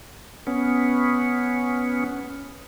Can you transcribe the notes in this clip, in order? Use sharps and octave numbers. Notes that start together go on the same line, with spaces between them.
B3 C#4